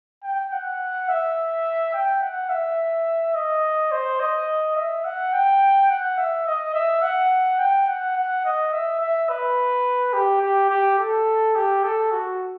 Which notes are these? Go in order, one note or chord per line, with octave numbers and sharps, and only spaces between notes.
G5
F#5
E5
G5
F#5
E5
D#5
C5
D#5
E5
F#5
G5
F#5
E5
D#5
E5
F#5
G5
F#5
F#5
D#5
E5
E5
B4
G4
G4
G4
A4
G4
A4
F#4